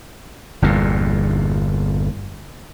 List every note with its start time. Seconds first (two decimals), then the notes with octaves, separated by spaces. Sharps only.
0.62 G1 E2 A#2